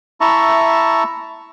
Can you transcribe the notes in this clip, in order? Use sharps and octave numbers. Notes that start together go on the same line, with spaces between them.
E4 E5 A5 A#5 C#6